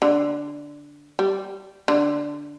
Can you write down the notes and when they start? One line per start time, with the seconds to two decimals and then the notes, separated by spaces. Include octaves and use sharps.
0.02 D3
1.19 G3
1.88 D3